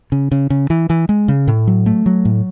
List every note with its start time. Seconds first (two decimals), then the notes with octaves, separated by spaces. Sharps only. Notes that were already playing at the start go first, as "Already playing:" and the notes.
0.12 C#3
0.32 C#3
0.50 C#3
0.70 E3
0.90 E3
1.09 G#3
1.28 C#3
1.47 A2
1.67 F#3
1.86 A3
2.06 F#3
2.25 A2